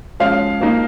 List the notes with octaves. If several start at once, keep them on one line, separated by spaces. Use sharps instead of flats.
F3 G#3 C#4 F5
F3 A#3 D#4